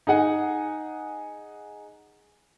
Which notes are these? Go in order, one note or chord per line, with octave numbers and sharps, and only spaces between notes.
D#4 G#4 F#5 G#5